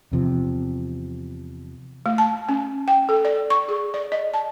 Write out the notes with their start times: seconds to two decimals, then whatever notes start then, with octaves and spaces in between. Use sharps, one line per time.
0.12 E2 C3 F3
2.06 A3
2.18 A5
2.49 C#4
2.88 G5
3.09 A4
3.25 D5
3.50 C#6
3.68 G#4
3.94 D5
4.12 D#5
4.34 A5